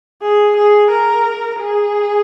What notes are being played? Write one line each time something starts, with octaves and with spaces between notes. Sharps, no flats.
G#4
G#4
A#4
G#4